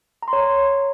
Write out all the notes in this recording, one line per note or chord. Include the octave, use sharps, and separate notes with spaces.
A#5
C6
C#5